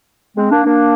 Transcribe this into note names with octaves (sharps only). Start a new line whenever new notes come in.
G#3 C4
A#3 D4
A#3 D4